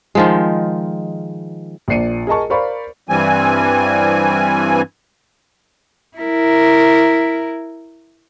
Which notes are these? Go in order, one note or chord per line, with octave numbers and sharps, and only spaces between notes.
D#3 F3 G#3
A#1 A#2 D5 C7 C#7 D#7
G#4 A#4 D#5 A5 C#6
A#4 C5 D5 F5 B5 C#6
G2 E3 G3 C4 G#5
E4 A#4